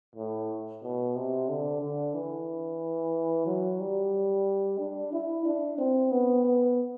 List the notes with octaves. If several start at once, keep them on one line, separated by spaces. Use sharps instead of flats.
A2
B2
C3
D3
D3
E3
F#3
G3
D4
E4
D4
C4
B3
B3